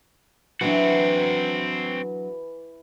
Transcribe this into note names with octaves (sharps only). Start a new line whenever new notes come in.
E3 F#3 C4 D4 F#4